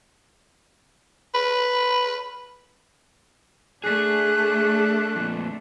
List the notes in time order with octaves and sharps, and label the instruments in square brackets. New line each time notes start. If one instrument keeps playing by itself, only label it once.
[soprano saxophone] B4
[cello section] A3 D4 [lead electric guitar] G#4 [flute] F#6
[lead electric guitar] F2 A#2